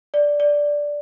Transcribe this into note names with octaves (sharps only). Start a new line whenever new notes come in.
D5
D5